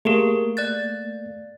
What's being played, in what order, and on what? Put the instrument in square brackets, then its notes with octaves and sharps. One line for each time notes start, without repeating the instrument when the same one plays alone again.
[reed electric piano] A3 A#3 F5 [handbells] G4 G#4 A#4
[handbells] D5 F#6 A6